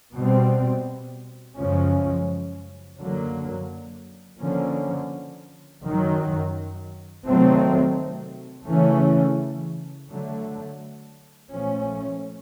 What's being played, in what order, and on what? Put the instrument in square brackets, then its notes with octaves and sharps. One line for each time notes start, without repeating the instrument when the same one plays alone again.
[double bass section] B2 G3 C4
F#2 C#3 F3 G#3 C#4
F#2 D3 F#3 A#3
D3 F3 A#3 C#4
F#2 D#3 F#3
C3 D#3 F#3 A3 C4
C#3 E3 A3 C#4
D3 F#3 A3
A#2 F3 A3 C#4